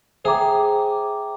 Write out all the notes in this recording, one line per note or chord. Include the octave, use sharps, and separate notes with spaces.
G#4 C5 E5 G5 A#5 D6